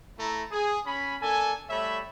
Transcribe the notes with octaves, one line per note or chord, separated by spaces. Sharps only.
A3 E4 A#5
G#4
C#4 G#5 B5
A#3 D4 A4 G#5
G3 A3 C#5 E5 B5